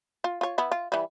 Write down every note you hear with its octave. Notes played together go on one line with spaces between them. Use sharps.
F4
F4 C#5
B3 E4
F4
E3 G3